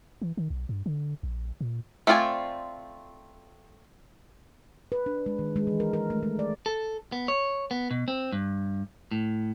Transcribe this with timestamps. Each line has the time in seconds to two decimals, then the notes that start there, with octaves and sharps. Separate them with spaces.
0.22 E3
0.37 D#3
0.50 B1
0.69 G2
0.86 D3
1.23 A#1
1.61 A#2
2.07 A3 C4 F4 D5 G#5
4.92 B4
5.06 D4
5.26 G#3
5.39 D#3
5.56 G#3
5.67 E3
5.80 A#4
5.93 A#4
6.10 A3
6.23 G#3
6.39 D5
6.66 A4
7.12 B3
7.28 C#5
7.71 B3
7.91 B2
8.08 C4
8.32 G2
9.11 A2